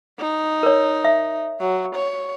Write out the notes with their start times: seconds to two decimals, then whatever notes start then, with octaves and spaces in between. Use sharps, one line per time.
0.19 D#4
0.63 A#4 C#5
1.05 E5
1.60 F#3
1.96 C#5